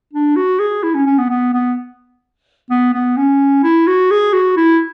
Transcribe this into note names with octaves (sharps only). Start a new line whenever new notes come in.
D4
F#4
G#4
E4
C#4
C#4
B3
B3
B3
B3
B3
C#4
E4
F#4
G#4
F#4
E4